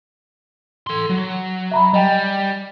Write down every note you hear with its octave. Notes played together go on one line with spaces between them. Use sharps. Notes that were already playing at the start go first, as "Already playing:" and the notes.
A4 C6
F#3
E5 A#5 B5
G3 D#5 G5 G#5